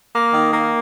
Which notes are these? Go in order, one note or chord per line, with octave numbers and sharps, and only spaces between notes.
A#3
D#3
A#3